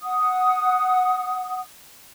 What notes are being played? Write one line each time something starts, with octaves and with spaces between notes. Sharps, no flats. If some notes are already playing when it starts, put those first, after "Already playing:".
F#5 D#6